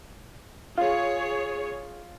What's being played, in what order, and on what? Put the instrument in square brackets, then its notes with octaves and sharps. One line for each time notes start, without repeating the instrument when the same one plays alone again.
[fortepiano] F4 [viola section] G#4 C#5